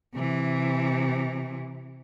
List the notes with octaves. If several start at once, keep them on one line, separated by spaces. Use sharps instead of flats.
C3 E3